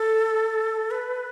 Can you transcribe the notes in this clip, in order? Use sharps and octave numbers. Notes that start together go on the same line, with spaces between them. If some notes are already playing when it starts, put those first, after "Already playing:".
Already playing: A4
B4